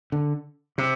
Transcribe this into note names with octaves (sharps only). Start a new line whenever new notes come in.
D3
C3